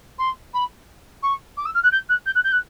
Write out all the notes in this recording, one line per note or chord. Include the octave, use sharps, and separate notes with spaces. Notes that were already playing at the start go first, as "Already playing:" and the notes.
C6
B5
C#6
D6
E6
F6
F#6
G6
F#6
G6
F#6
G6
F#6